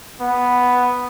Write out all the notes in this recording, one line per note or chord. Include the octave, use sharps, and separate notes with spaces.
B3